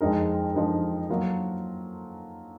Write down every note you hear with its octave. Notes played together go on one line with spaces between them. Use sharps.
F2 F3 G#3 D#4 A#4
F2 F3 G#3 D#4 A#4
F#3 A#3 F4 A#4